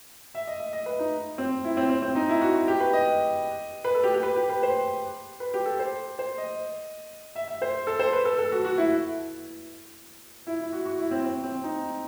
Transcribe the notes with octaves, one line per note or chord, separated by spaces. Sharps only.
E5
D#5
E5
D#5
B4
D#4
C4
E4
C4
C4
C4
D#4
E4
F#4
G4
B4
D#5
B4
A4
G4
G4
B4
G4
B4
C5
B4
G4
A4
C5
C5
D#5
E5
E5
C5
A4
C5
B4
A4
A4
F#4
F#4
E4
E4
E4
F#4
F#4
E4
C4
C4
C4
D#4